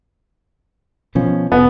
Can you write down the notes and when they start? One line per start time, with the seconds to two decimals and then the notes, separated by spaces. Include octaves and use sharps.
1.15 B2 F3 C#4
1.52 F1 B3